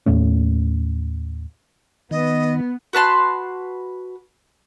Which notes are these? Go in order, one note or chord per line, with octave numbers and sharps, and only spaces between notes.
D#2 A2 A3 C#4
D#3 B3 D#5
F#4 B4 A5 C6